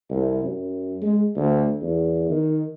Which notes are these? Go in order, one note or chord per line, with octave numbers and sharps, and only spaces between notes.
C2
F#2
G#3
D2
E2
D#3